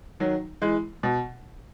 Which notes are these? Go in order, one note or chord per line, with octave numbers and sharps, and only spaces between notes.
D#3 F#3
E3 G#3
B2